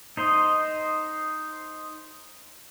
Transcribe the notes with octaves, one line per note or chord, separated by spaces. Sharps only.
D#4 C5 D#5